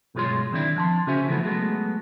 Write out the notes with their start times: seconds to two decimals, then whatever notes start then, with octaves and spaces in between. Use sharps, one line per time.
0.15 B1 G2 G#3 F4 C#5 C6
0.52 D#3 C4 D4 E4
0.76 F3 A5 C6
1.07 C#3 C#4 F#4 C5 E5 G#5
1.28 E3 F3 A3 B3
1.44 F#3 G#3 A3 B3